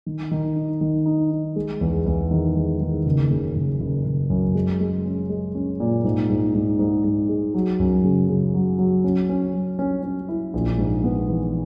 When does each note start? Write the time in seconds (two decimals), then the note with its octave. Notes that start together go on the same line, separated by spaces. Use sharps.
0.06 D#3
0.31 D#3
0.56 D#4
0.81 D#3
1.06 D#4
1.31 D#4
1.56 G#3
1.81 E2
2.06 E2
2.31 D#3
2.56 G#3
2.81 D#3
3.06 F#1
3.31 C#3
3.56 F#1
3.81 F#1
4.05 F#1
4.30 F#2
4.55 G#3
4.80 G#3
5.05 C#4
5.29 G#3
5.55 C#4
5.80 A#2
6.04 G#2
6.29 G#2
6.54 G#2
6.79 G#2
7.04 G#2
7.29 G#3
7.54 F#3
7.80 F#2
8.04 C#3
8.29 C#3
8.54 F#3
8.79 F#3
9.04 C#4
9.29 C#4
9.54 F#3
9.79 C#4
10.03 C#4
10.28 E4
10.54 A#1
10.78 G#2
11.03 B3
11.28 E3